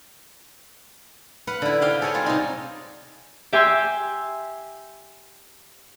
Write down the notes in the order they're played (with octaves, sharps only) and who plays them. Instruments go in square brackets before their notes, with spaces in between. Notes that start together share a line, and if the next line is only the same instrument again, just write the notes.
[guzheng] B4 F5 F#5
D3 E4
C3 G4 F5 G5
G#4 A4 C#5 F#5 G#5
G3 G#3 C4 F4
C3 D#4
[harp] G4 E5 G5 G#5 C6 E6